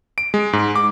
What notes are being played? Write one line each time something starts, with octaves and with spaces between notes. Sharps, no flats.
D7
G#3
G#2
D6